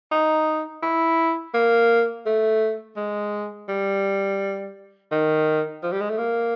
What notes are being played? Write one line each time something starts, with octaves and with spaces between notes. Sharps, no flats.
D#4
E4
A#3
A3
G#3
G3
D#3
F3
G3
G#3
A3
A#3